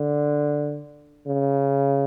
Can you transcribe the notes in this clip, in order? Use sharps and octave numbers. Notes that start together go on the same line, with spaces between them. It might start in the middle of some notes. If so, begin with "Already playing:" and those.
Already playing: D3
C#3